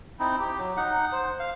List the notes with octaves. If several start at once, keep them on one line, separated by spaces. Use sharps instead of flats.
C4 D#4 E4
G4
F#3
D#4 F#5
C5
F5